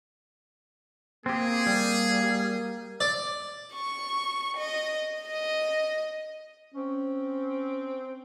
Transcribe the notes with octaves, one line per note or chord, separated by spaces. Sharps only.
A#3 C4 G4 G#4
G3
D5
C#6
D#5
D#5
C4 C#4